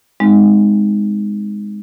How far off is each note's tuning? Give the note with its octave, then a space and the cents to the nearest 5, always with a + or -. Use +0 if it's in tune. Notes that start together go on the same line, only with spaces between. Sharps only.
G#3 -10 C4 -30 D#4 +0